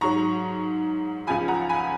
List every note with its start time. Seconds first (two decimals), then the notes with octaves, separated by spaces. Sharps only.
0.01 G#2 F#3 A#5 C#6
1.27 C#2 C#3 F3 G#5 B5
1.48 F#5 A#5
1.69 G#5 B5